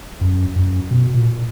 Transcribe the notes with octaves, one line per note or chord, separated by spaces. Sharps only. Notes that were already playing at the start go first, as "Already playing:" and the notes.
F#2
F#2
B2
A#2